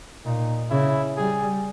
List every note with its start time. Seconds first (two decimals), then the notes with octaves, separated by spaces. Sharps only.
0.25 A#2 D#4
0.70 C#3 E4
1.17 G3 G#4